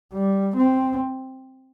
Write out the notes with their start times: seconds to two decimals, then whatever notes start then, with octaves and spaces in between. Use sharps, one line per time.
0.13 G3
0.57 C4